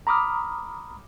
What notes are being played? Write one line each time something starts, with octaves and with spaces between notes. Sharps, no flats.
A#5 B5 D6 D#6 F6